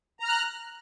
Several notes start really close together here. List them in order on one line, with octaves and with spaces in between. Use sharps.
A#5 F6 F#6